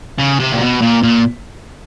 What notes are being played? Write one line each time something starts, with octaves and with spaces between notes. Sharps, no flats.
C#3
C3
A#2
B2
A#2
A#2